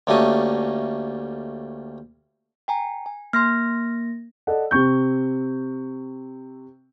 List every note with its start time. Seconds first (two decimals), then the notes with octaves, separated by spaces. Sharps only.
0.07 D2 G3 A3 A#3 C#4 D#5
2.68 G5 G#5 A#5
3.06 G#5
3.33 A#3 C6 F6 A#6
4.47 A4 D5 D#5 F#5
4.71 C3 C4 C#6 G6